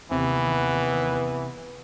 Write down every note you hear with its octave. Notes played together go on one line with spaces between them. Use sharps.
D#2 C3 E3 B3